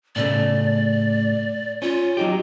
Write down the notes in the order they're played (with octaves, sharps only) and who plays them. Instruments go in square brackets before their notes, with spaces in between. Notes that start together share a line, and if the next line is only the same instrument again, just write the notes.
[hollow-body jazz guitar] A2 C#3 A3 [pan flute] D5
[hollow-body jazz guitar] C#4 [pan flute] F4
[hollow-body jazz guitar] F#3 D#4 G4